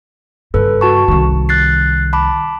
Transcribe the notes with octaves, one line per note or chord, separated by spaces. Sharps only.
G2 C#3 A4 B4
F#4 A5 C#6
C2 D#3
F#6 A6 C7
A5 B5 D6